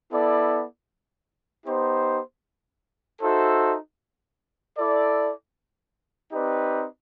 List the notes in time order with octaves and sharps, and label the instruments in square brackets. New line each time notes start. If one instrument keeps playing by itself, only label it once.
[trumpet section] B3 E4 A4 D5
B3 D#4 G4 C5
D#4 F#4 A4 C5 E5
E4 A4 D5
C4 D#4 G4 B4 D5